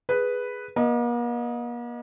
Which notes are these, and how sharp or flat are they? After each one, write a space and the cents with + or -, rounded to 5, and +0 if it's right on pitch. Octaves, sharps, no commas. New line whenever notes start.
G#4 +0 B4 +0
A#3 +45 D#5 +0